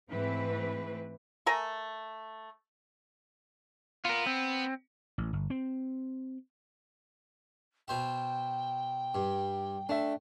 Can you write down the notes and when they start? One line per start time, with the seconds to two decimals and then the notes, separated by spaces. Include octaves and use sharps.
0.10 G#2 E3 A3 C4 B4
1.46 A3 A#4 G#5
4.05 B3 F4 A#4
4.26 C4
5.18 A1
5.33 G1
5.50 C4
7.88 B2 C5 E5 G5
9.15 G2
9.89 A3 D4 E5